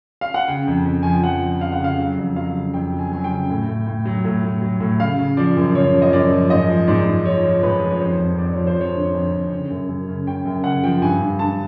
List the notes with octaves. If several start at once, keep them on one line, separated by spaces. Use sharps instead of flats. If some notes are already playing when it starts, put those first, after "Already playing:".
F5
F#5
C#3 G5
F2
F2
F3 G#5
G5
F3 F#5
F2
C#3 F5
F#5
C#3
F5
F#3
F2
F#3 F5
C#3
F2 G5
F#3
G#5
F#3 G#5
G5
C#3
A2
A2
A2
F#3
A2
A2
F#3
A2
C#3 F5
C#3
F3 D5
F#2
C#3 C#5
F3
D#5
F#2 D5
F3
G#2 D#5
F3
G#2 D5
G#2
F3 C#5
F3
G#2 B4
F3
C#5
F2 C5
F2
F2 D5
F3 C#5
C5
F2 C#5
D3
F2
F2
C#3
F#2
F#2
C#3
C#3 G5
F#2
C#3 F#5
F3 G5
G2 G#5
G2
D3 A5